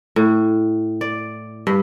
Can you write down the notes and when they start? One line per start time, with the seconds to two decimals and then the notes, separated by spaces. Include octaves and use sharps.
0.16 A2
1.01 D5
1.67 G2